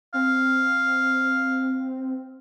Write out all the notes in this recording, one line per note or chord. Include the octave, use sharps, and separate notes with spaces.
C4 F5